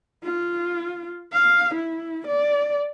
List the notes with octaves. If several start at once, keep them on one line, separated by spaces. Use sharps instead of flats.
F4
F5
E4
D5